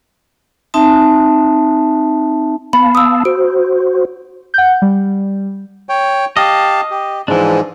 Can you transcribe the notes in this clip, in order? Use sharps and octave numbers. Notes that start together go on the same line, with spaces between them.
C4 D#4 E5 A5
B3 F5 A5 B5
D#6 E6
F#4 C5 D7
F#5 G6
G3
C#5 G5
G4 D#5 F5 A5
G4
G#2 E3 F3 G#3 D4